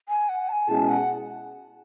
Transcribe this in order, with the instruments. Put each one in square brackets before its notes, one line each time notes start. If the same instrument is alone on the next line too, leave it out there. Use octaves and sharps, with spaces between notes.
[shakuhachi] G#5
F#5
A5
G#5
[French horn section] B2 G#3 C#4 E4 G#4 [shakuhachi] A5
[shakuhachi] F#5